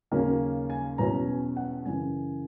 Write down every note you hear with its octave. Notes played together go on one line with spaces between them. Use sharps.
D#2 C#3 F#3 A#3 C#4 A#4
G#5
E2 B2 F#3 C#4 A#5
G#5
F#5
F#2 C#3 E3 G#5